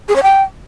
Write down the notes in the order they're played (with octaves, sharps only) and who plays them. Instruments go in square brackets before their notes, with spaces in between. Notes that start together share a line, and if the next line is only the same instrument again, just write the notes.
[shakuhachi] G#4
C#5
G5